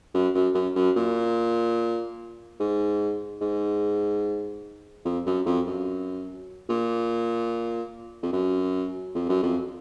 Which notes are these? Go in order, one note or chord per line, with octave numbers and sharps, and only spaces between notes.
F#2
F#2
F#2
F#2
A#2
G#2
G#2
F2
F#2
F2
F#2
A#2
F2
F#2
F2
F#2
F2